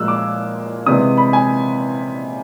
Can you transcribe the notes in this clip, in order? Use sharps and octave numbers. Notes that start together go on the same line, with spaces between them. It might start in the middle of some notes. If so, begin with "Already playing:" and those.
Already playing: A#2 F3 G#3 E6 F#6
D6
C3 E3 G#3 D#6
B5
G#5